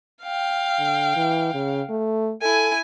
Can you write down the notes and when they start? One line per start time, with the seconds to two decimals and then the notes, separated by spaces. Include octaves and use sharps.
0.23 F5 G5
0.79 D3
1.16 E3
1.54 C#3
1.89 A3
2.42 E4 A4 G#5